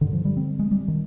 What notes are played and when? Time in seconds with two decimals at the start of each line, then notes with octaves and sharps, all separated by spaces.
0.01 G2 D3 D#3
0.13 F3
0.25 G3
0.37 C4
0.59 G#3
0.71 G3
0.88 D#3